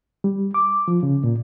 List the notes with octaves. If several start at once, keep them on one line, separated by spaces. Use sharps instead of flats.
G3
D6
F3
C#3
A#2